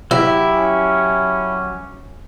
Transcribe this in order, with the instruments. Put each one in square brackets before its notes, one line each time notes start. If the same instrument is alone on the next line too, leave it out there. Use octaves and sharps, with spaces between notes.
[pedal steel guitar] F#3 G4 E5 [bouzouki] E4
[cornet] C#4